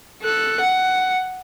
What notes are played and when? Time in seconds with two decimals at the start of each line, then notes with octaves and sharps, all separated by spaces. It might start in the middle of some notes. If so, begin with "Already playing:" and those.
0.23 A4 F#6
0.61 F#5